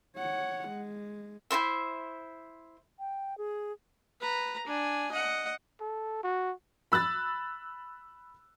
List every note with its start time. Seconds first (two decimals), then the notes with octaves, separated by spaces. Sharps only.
0.17 C#5 F#5
0.69 G#3
1.50 E4 F#4 C5 E5
2.99 G5
3.38 G#4
4.21 B4 A#5
4.67 D4 G#5
5.12 D#5 F#5
5.80 A4
6.23 F#4
6.92 B5 E6 F#6 A6